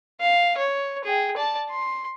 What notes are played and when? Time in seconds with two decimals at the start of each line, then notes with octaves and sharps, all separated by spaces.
0.21 F5
0.58 C#5
1.04 G#4 G5
1.37 D5 A5
1.70 C6